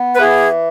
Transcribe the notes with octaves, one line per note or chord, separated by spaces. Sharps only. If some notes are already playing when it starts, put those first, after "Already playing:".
Already playing: B3
B4
E3 G#4